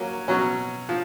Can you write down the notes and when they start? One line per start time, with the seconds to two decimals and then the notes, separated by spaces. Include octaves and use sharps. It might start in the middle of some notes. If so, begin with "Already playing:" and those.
Already playing: F#3 A#3 C#4
0.28 B2 F#3 C#4
0.89 F3